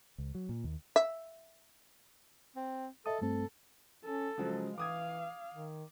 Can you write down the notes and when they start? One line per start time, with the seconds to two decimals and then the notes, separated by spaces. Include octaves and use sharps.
0.18 C#2
0.35 F#3
0.49 A#2
0.64 D#2
0.96 E5
2.56 C4
3.06 A4 D#5 E5 D#6
3.22 G2 A3 C4 A4
4.05 C#4 A4
4.38 C#3 F3 F#3 G#3
4.78 E3 F5 D6 D#6 G#6
5.54 D#3